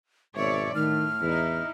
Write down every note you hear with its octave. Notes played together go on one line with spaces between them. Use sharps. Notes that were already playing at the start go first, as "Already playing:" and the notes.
G#1 B2 C#5 D5 E5
A2 D#3 A3 F6
E2 D#4 E4